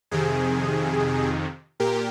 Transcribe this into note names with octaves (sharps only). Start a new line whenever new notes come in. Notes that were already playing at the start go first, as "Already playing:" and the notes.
F2 C3 D#3 G#4
A#2 G4 A#4